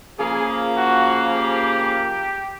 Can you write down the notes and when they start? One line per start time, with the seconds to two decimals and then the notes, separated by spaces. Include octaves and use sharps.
0.18 C#3 F3 A#3 G#4
0.76 F#4
1.35 G4